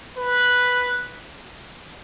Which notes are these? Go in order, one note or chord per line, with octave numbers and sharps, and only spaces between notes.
B4